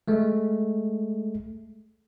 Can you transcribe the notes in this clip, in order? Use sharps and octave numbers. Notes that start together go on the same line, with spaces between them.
G#3 A3